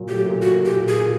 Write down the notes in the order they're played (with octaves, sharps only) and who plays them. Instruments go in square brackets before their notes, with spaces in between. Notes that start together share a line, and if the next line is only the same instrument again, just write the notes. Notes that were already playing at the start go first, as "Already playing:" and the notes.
Already playing: [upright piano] A#2 F#3
[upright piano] A3 [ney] G4
[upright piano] A#2
[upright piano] A#2 [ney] F#4
[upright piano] A#2
[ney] G4
[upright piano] A#2
[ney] G#4
[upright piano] A#2